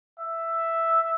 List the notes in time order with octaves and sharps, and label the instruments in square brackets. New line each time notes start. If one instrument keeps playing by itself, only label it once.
[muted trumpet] E5